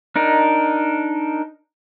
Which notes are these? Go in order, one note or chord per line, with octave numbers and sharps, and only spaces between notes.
D4 D#4 A#4